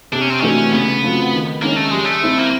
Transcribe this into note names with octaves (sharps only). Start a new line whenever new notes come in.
C3 D4
C#4
C4
E3 A3 C#4 D4 F#4
C#3 B3
F#3 A3 C4 F4
D#3
G#3 A#3 C#4
A3
G3 G#3
A3
C4 E4
A#3